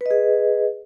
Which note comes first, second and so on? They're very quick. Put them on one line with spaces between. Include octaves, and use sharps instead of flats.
B4 D#5 G#4